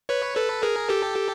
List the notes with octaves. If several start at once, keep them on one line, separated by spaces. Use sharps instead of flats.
B4 C#5
A4 B4
G#4 A#4
G4 A4